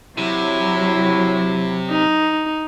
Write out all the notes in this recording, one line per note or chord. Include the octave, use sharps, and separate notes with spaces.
C3 F#3 E4
D#4